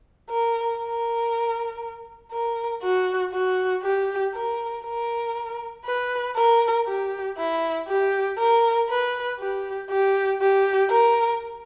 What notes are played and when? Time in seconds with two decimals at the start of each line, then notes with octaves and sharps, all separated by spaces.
0.30 A#4
0.79 A#4
2.31 A#4
2.82 F#4
3.33 F#4
3.83 G4
4.34 A#4
4.85 A#4
5.85 B4
6.36 A#4
6.87 G4
7.37 E4
7.88 G4
8.39 A#4
8.89 B4
9.39 G4
9.90 G4
10.41 G4
10.90 A#4